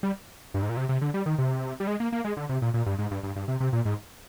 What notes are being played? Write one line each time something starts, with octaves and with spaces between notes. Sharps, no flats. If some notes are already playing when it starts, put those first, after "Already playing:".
G3
G2
G#2
A#2
C3
C3
D3
G3
D#3
C3
G3
G#3
A#3
A#3
G#3
D3
C3
A#2
A#2
G2
G#2
G2
G2
G2
C3
C3
A#2
G#2